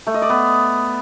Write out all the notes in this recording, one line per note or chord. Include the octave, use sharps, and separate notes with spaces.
A3
D#5
D5
B3